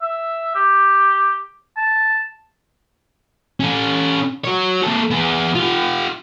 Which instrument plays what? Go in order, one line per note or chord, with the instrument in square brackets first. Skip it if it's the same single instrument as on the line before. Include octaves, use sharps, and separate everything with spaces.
[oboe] E5
G4
A5
[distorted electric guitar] C#4 A4
F#4 C#5
A#3 A4
B3 G#4
F4 G4